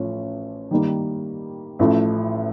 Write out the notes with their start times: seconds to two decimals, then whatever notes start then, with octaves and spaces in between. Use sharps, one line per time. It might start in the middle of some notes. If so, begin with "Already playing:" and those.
Already playing: A1 F3 A3 C#4
0.71 D#3 G3 A#3
1.79 A1 A2 F3 A3